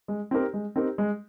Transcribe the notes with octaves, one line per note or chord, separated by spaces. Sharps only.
G#3
C4 D#4 G4 A#4
G#3
C4 D#4 G4 A#4
G#3